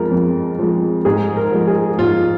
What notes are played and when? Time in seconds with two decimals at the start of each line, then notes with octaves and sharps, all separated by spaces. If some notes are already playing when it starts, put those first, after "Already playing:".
Already playing: F2 F3 G#3 F4 A#4
0.11 F2
0.59 F3 G#3
1.05 G#2 G#4
1.37 A#4
1.52 F3 G#3
1.67 G#4
1.99 G#2 F4